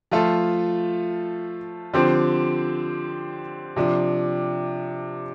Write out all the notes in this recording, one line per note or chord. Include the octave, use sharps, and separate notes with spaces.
F3 A3 F4 A4
D3 F3 C4 G4 C5
C3 F3 D4